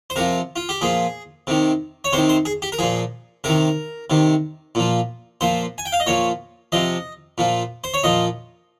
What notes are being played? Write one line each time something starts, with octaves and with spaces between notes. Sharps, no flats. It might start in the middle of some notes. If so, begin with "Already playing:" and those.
C5
C3 F3 A#4
F4
G4
A#2 F3 G#4
C3 D#3
C#5
C3 D#3 C5
C5
G#4
G4
A#4
A#2 F3 G#4
C3 D#3 A#4
C3 D#3
A#2 F3
A#2 F3 C5
G#5
G5
F5
D#5
A#2 F3 C#5
C3 F3 D#5
A#2 F3
C5
C#5
A#2 F3 D#5